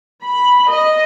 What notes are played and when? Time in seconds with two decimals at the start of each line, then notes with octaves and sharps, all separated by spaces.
0.22 B5
0.69 D#5